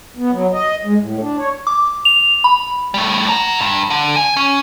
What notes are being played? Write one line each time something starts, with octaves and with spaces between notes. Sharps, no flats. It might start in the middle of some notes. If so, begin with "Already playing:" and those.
B3
F#3
D#5
G#3
A2
D4
C#5
D6
F7
B5
G3 A3
F#5 A#5
G2
D3
G#5
C#4